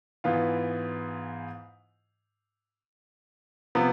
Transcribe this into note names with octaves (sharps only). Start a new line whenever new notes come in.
G#2 E3 B3 F4
C3 F3 B3